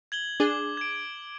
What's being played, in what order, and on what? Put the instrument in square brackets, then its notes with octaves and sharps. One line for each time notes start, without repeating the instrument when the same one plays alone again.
[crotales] G#6 F#7 G7
[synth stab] D4 G#4 [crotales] D6 G7
[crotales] G#6 D7